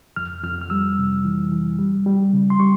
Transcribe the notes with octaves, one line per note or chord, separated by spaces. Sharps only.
F2 F6
F2 F6
F6
G3 E6
C3
E3
E3
G3
G3
C#3
C6
G3 C#6